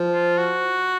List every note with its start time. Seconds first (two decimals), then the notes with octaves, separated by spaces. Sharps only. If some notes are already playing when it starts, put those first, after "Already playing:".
Already playing: F3
0.12 F4
0.38 F#4